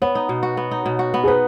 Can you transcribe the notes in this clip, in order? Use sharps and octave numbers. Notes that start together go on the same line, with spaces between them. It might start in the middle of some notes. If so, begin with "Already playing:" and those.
B3 C#5
D#4
B2
F#4
B3
D#4
B2
F#4
B3
G#4
D#4 B4